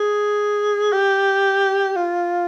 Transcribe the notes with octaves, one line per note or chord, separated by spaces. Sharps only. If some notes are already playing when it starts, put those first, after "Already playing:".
Already playing: G#4
G4
F4